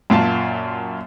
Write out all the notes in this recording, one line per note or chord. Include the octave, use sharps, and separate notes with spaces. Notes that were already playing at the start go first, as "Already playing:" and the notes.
F#2 A#2 F4 A5